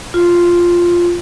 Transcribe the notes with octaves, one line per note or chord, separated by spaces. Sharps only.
F4